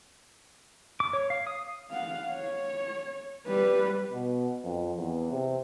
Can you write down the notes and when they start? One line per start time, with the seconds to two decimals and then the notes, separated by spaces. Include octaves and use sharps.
1.00 D6
1.13 C#5
1.30 F5
1.47 D#6
1.91 F5 F#5
2.32 C#5
3.47 G3 B4
4.12 B2
4.64 F2
4.97 E2
5.31 C3